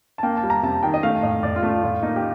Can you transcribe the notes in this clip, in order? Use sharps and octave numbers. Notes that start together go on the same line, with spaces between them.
A5
A#3 G5
A5
G3
A#5
C3 A5
D#3 G5
D#5
A3 F5
A2 D#5
A2 D5
F4
A3
F4
A2 F4
A#3 D#4
G4